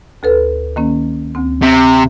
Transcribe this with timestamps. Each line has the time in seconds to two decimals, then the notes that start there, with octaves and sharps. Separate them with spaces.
0.23 D2 A4 B4
0.76 D#3 A#3 C#4
1.35 D2 C4
1.63 C3